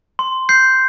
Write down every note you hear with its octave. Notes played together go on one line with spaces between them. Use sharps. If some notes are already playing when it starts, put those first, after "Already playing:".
C6
G6 C7